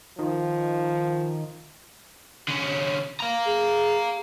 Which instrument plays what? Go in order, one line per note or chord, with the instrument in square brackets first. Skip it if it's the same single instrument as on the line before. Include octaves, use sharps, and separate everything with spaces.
[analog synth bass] D#3 [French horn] F3
[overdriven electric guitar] D3 C#4
F5 A#5
[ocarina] G#4